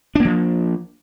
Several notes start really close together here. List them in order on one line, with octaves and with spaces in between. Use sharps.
D4 A#3 F3